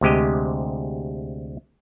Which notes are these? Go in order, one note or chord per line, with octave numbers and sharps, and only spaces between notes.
D2 C3 G#3 G4 D#5